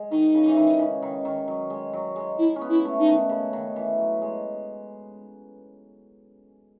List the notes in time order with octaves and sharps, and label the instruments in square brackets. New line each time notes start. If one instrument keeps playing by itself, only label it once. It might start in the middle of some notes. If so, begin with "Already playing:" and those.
Already playing: [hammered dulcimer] G#3
[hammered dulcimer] D#3 [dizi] D#4
[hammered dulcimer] C#3
E3
D#3
C#3
D#3
D#3
F#3
G#3
F#3
G#3
[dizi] E4
[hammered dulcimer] C#4
B3
[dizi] E4
[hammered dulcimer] A3
[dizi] D#4
[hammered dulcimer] D#3
C#3
D#3
E3
F#3
G#3